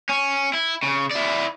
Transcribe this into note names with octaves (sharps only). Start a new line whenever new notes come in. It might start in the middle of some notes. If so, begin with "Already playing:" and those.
C#4
E4
C#3
E4 D5